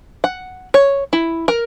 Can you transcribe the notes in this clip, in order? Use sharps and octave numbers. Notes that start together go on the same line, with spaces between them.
F#5
C#5
E4
A#4